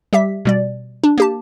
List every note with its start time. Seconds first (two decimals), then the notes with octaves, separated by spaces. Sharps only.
0.13 G3 G4 E5 B6
0.45 B2 G3 D5
1.04 D4
1.18 A#3 G4 A5